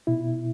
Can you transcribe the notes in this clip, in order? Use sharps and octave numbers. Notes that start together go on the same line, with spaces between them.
B2 E4